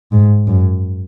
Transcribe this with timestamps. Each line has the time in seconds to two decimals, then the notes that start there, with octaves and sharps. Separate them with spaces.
0.12 G#2
0.47 F#2